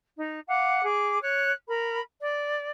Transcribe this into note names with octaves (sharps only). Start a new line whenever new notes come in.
D#4
F5 F#5 D6
G#4 D6
C#5 F#6
A#4 B5
D5